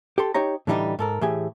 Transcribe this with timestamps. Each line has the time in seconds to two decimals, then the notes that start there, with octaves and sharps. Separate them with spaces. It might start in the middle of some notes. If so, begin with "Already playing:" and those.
0.18 G4 A4 C6
0.34 D#4 G4 C#5 A#5
0.67 A2 D3 E3 G3 D#4 G4
0.99 G#2 A4 A#4
1.21 A2 E3 G4 G#4 G#5